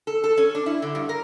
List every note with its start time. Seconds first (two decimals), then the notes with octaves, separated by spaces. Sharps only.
0.07 A4
0.24 A4
0.38 C#4
0.55 D4
0.66 E4
0.82 D3
0.95 G2
1.09 A#4